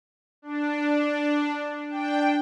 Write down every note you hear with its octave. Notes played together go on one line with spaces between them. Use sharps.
D4
D4 G5